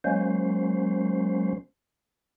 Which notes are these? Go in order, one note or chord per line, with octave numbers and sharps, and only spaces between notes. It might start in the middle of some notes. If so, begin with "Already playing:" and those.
F#3 G#3 A#3 C#4 C5